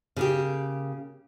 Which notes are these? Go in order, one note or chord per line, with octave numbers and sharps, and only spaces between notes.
C#3 A#3 G4